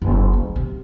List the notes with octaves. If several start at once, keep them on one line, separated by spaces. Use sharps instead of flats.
F#1
D2
C3